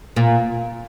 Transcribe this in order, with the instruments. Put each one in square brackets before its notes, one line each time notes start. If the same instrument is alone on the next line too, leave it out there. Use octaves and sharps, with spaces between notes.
[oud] A#2